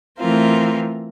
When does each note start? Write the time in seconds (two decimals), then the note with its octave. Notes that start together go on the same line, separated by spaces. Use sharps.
0.19 E3 A3 C4 F4 A#4